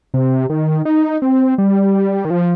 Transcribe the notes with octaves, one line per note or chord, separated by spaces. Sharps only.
C3
D#3
D#4
C4
G3
D#3
F3